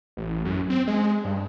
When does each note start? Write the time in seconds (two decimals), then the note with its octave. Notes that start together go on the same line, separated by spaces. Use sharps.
0.17 A1
0.45 F#2
0.70 C4
0.87 G#3
1.24 G2